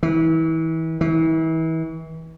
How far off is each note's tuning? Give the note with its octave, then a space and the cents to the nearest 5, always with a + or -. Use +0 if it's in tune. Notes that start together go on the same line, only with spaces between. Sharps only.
E3 -30
E3 -35